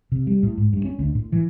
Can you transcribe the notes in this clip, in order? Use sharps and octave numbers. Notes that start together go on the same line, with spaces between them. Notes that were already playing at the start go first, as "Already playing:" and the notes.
C3
G3
A2
G#2
G2
C#4
D2
A2
E3